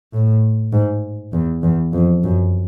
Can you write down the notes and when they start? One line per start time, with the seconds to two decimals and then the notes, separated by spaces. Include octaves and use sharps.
0.13 A2
0.72 G#2
1.33 E2
1.63 E2
1.93 F2
2.23 F#2